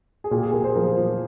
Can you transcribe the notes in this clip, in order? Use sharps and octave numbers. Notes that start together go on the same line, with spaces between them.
G#4
A#2 G4
G#4
A#2 A#4
C5
F3 A#4
F3